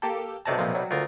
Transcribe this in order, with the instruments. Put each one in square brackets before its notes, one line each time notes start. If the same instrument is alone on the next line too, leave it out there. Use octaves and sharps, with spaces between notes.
[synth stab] A#3 G4 A4
[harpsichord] B1 C3 A#5 [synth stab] A3 D5 A5
[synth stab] A#2 F3 A#3
F#3 G3
[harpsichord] D2 F4 A#4